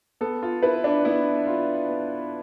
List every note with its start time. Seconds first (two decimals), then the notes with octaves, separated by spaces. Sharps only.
0.21 B3 A4
0.42 F4
0.63 E4 B4
0.84 D4
1.05 B3 E4
1.47 F4
1.89 B3